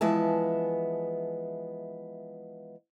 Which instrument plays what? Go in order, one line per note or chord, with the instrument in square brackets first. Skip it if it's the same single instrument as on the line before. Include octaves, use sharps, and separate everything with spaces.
[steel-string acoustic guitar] E3 F3 G#3 B3 E5 A5